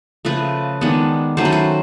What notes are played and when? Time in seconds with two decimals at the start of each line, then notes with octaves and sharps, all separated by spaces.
0.25 C#3 F3 A3 B4
0.81 D#3 G#3 B3 D4
1.37 D#3 F#3 A3 C#4 C5
1.45 B4
1.52 C5